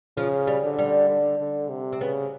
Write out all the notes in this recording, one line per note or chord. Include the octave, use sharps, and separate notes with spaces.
C#3 F3
G3
D3
G3
D3
D3
C3
C4
C#3 B3